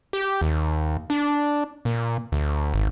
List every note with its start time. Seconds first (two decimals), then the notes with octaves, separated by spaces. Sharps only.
0.13 G4
0.41 D#2
1.10 D4
1.85 A#2
2.32 D2
2.74 G#1